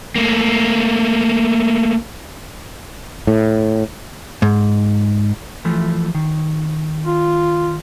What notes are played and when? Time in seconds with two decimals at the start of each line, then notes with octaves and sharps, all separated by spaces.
0.16 A3 A#3
3.27 A2
4.42 G#2
5.65 E3 F3 A3
6.15 D#3
7.06 F4